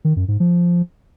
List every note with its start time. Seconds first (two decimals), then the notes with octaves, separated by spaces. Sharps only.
0.04 D#3
0.16 F#2
0.28 G#2
0.40 F3